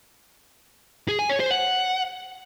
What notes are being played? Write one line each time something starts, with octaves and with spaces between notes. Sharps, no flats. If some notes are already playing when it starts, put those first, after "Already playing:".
G#4
G#5
C#5
C5
F#5